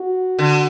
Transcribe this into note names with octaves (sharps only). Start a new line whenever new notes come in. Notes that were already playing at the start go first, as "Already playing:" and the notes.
Already playing: F#4
D3